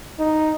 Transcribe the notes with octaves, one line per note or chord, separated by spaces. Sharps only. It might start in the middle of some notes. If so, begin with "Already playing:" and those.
D#4